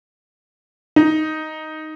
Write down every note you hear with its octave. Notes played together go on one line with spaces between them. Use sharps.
D#4